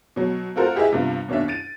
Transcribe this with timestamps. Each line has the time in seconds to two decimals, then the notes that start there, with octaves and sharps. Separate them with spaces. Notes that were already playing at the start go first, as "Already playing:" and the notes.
0.16 B2 F#3
0.56 C4 F4 F#4 A4 A#4 C5
0.75 E4 G4 G#4 B4 D#5 E5
0.92 G2 C3 G3 B3 F4
1.28 D#2 B2 C#4 D4 E5
1.48 A6 D7 D#7